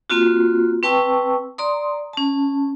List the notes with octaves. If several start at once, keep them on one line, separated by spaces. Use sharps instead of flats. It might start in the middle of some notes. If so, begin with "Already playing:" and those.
A#3 C4 F4 F#4
C4 B4 G5 A5 C#6 E6
D5 A#5 C6 D#6
C#4 A5